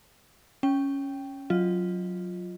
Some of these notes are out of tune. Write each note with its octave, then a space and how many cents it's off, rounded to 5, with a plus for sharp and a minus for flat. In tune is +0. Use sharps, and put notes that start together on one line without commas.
C#4 +0 G5 +0
F#3 -15 F4 +0 D#5 +0